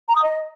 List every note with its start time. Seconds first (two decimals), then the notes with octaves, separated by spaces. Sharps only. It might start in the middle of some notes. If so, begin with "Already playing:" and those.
0.08 A#5
0.15 D#6
0.22 D#5